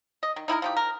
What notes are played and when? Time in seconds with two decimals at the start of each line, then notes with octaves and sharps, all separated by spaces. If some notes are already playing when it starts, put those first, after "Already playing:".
0.23 D#5
0.36 D#3
0.48 D#4 E4 G4 A#4
0.62 F3 D#4 G4
0.77 A#4